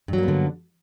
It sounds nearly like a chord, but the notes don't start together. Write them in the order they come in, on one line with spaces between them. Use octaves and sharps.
G2 F#3 A#3 B3 D3